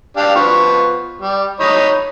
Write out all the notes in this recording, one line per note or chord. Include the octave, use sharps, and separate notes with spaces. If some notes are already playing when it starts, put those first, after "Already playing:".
D4 G4 F5
F3 B3 C#6
G3
D#4 C#5 B5